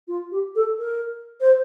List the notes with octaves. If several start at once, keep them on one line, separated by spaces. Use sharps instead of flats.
F4
G4
A4
A#4
C5